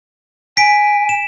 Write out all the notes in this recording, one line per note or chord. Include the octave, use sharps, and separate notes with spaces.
G#5 B6 D7
E7